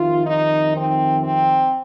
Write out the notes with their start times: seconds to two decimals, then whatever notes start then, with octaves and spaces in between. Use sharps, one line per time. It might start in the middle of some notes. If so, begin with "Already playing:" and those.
Already playing: F2 C3 D#3 F4
0.26 D#4
0.75 C4
1.23 C4